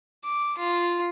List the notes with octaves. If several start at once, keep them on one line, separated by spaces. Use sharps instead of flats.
D6
F4